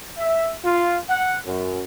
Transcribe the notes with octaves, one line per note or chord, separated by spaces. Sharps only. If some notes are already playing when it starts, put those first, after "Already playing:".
E5
F4
F#5
F#2